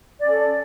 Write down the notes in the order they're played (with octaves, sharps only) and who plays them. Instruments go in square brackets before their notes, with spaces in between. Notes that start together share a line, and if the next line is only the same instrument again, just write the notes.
[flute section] D5
C#4
A4